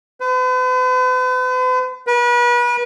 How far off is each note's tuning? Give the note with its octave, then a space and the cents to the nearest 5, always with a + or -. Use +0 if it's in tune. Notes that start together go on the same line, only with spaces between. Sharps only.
B4 +45
B4 -35